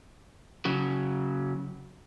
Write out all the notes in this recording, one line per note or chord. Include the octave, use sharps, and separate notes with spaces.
C#3 F#3